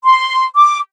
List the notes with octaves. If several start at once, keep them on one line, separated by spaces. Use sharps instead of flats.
C6
D6